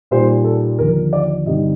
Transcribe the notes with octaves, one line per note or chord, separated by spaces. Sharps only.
A#2 G3 A#3 D#4 C5
A4
D#2 D3 F3 A#4
D5
G2 D3 G3 C4 D#4 D#5